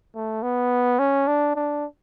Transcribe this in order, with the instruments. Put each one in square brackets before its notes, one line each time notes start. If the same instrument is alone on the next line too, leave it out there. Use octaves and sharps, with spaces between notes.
[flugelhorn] A3
B3
C#4
D4
D4